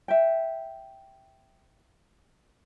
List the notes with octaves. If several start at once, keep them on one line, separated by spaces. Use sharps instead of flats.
E5 G5